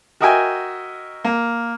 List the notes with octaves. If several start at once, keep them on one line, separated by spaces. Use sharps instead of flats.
F#4 A#4 D#5 E5 G5 G#5
A#3